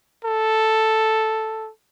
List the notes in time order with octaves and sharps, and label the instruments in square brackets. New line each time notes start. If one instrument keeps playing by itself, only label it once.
[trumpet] A4